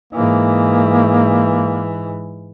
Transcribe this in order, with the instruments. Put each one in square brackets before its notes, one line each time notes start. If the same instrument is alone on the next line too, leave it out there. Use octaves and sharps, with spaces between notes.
[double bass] G#2 E3 [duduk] A#3